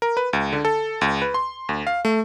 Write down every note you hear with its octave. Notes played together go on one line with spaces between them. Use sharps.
A#4
B4
C#2
D3
A4
C#2
B4
C6
D2
F5
A3